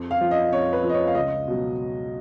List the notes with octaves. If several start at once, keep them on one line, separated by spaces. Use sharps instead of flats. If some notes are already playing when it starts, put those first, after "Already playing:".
Already playing: F2
F5
F3
D#5
F2 C#5
B4
F3
D#5
C#5
F5
C#2 D#5
B2 F#3